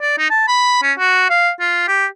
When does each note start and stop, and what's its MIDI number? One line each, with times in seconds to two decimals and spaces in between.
0.02 0.16 74
0.18 0.28 63
0.30 0.48 81
0.48 0.79 83
0.83 0.93 61
0.99 1.28 66
1.30 1.51 77
1.60 1.84 65
1.88 2.06 67